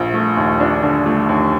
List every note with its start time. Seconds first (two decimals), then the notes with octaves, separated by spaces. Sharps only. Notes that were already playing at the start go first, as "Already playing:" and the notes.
Already playing: A#1 F3
0.14 A3
0.37 D#2
0.60 D4
0.83 D3
1.06 A3
1.29 D#2